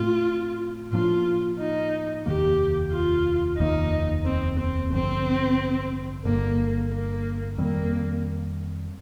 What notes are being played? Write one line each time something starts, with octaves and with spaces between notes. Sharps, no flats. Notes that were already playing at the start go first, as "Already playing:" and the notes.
Already playing: A2 A3 C4 F4
A2 F3 A#3 D4 F4
D#4
F1 D#2 D#3 A#3 G4
F4
F1 D#2 D#3 A#3 D#4
C4
C4
A1 G2 D3 F3 C4
G1 G2 D3 A#3
A#3
F2 D#3 G3 A#3 C4